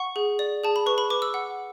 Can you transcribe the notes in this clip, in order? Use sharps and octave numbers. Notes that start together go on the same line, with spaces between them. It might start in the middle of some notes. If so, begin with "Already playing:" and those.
Already playing: F#5 C#6
G#4
D5
G#4 A5
B5
B4 C#6
B5
B4 D6
E6
F#5